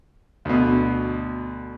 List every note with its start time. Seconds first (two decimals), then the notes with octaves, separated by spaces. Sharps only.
0.45 D2 B2